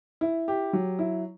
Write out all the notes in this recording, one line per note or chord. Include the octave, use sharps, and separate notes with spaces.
E4
G4
F#3
E4